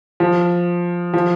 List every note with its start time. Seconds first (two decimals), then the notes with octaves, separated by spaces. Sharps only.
0.20 F3
1.13 F3